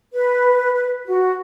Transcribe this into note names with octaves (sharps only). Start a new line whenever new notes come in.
B4
B4
F#4